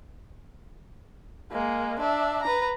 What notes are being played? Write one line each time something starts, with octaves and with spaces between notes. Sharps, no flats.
G#3 A#3
D4 E5
B4 A#5